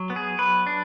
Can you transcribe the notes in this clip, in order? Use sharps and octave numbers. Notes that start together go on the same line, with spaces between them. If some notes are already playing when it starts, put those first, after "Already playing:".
Already playing: F#3
B3
G#4
F#3 B4
D4